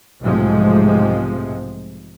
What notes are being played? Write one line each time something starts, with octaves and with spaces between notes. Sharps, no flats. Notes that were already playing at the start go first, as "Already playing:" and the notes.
B1 G#2 C3 F3 G#3 A3